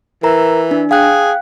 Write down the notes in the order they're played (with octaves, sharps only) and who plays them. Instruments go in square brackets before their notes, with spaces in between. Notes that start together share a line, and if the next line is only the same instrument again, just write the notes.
[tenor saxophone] E3 [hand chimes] A#4 A#5
[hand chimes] D4
[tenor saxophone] G#4 [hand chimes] F5 G5 F#6